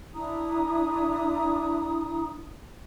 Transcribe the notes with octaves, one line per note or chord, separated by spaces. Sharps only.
D4 E4 A#5 D#6